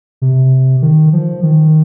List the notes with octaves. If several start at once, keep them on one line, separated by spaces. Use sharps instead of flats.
C3
D#3
F3
D#3